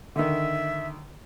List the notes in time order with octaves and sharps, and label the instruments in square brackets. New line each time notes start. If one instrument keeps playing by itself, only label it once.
[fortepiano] D3 D#3 [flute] E5